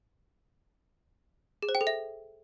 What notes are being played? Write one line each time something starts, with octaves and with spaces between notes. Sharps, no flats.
G#4
C5
G5
A4
E5